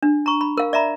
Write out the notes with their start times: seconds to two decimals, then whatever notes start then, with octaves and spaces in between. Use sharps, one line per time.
0.03 D4
0.26 A#5 C#6
0.41 B5
0.57 A#4 F5
0.73 D5 E5 A#5 B5